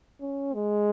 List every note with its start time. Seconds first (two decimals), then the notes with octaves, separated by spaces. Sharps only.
0.21 C#4
0.54 G#3